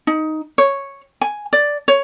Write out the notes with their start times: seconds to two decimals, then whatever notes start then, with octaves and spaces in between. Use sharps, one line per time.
0.07 D#4
0.58 C#5
1.21 G#5
1.53 D5
1.88 C#5